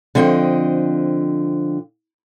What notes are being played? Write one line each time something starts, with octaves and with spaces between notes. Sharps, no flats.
D3 F3 C4 D#5 G5